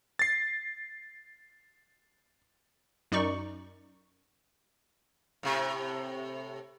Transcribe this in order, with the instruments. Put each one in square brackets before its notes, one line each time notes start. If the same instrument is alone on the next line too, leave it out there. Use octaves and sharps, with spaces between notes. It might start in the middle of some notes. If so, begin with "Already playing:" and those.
[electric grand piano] A6 C7
[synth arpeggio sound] F#2 D#4 D5 C#6
[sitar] A2 C3